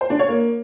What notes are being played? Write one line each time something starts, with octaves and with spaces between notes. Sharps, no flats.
C5
D4
C#5
A#3